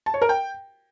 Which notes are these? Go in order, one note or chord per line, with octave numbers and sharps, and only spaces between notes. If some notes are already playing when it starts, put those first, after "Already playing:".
A5
C#5
A#4
G5